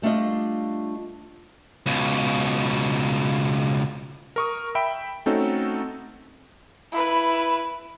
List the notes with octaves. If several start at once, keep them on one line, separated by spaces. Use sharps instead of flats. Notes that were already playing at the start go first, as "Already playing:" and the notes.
G3 A3 D4 F4 D#5
C#2 B2
A#4 C#6 D#6
E5 G5 B5 D7
A3 C4 C#4 D#4 F#4 A4
E4 B4